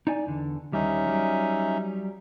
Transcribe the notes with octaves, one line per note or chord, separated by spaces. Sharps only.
D#4 D5 G#5
E2 D3
D#2 G3 C#4 D#4 E5
F#3 G3